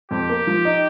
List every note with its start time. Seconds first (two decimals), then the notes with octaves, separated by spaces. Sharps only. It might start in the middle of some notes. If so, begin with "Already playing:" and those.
0.11 F2 G4
0.29 A#3
0.47 F3
0.65 D#4